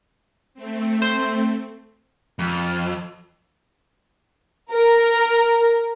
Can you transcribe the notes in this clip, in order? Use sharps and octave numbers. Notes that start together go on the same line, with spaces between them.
A3 C4
C5
F2
A#4